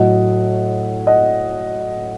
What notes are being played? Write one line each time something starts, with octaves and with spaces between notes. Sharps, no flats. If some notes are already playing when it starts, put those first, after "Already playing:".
Already playing: A2 F#3 A3 D#5 F#5
D#5 F#5